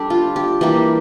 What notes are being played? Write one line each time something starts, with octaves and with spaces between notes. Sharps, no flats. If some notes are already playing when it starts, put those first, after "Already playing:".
Already playing: G3 D4 G4 A4
F4
G4
E3 G3 A#3 G4